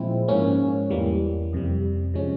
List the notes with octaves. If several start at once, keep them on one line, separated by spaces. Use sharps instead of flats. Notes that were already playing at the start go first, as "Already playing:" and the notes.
Already playing: A#2 F3 G#3 C4 E4
G#2 F3 A#3 C#4
E2 E3 G3 A#3
F2 C3 G3
C3 F3 G#3 C#4